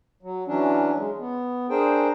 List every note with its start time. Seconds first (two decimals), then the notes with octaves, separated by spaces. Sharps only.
0.23 F#3
0.47 E3 F#3 C#4 D4
0.96 G#3
1.19 B3
1.70 D4 G#4 A#4 C5 G5